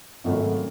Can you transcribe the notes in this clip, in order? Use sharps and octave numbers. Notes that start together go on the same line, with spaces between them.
G#1 F#2 C#3 F#3 A3